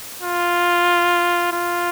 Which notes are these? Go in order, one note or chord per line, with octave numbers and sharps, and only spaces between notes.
F4
F4